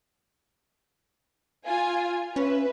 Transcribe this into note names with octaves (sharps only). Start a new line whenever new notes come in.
F4 G#5
C#4 B4 E5